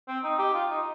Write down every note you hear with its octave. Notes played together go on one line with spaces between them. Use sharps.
C4
D#4
G4
F4
D#4